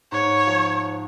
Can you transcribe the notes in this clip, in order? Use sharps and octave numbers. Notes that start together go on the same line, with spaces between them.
G#2 C#5
F3